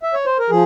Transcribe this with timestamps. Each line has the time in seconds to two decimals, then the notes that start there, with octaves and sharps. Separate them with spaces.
0.03 E5
0.14 C#5
0.26 C5
0.39 A#4
0.50 F3 G#4